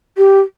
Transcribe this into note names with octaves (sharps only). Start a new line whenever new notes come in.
G4